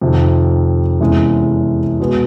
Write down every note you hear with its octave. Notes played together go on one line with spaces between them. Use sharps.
F2 C3 D#3
E2 C3 E3 G#3 C#4
B2 G#3 B3